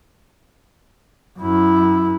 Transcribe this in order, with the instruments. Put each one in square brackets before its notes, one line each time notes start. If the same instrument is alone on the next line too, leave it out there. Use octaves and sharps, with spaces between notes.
[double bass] F#2 E4